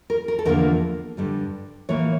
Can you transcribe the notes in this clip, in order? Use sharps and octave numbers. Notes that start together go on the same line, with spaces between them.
A#4
A#4
A4
E2 D3 F3 A#3 A#4
G2 D3 G3
A2 E3 A#3 C#5